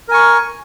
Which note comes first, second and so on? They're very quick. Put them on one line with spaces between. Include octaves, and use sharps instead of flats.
A#4 G#5 C#6